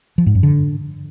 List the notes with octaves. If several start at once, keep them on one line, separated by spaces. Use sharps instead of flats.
F3
G#2
F#2
D3